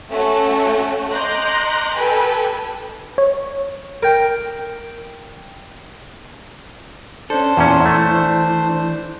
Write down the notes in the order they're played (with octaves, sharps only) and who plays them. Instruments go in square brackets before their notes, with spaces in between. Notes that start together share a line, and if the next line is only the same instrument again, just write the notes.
[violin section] A3 C#4 F#4 A4
D#5 A#5 C6 D6 F#6 G6
G4 A4 B4 G5 G#5
[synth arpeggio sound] C#5
[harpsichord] A#4 G5
[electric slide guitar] C#4 A4 [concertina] D4 C5
[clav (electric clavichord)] E2 A#2 C#4 [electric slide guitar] E3
[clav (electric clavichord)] A3